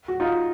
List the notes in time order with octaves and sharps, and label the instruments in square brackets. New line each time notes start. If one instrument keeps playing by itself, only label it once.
[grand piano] F#4
D#4 F4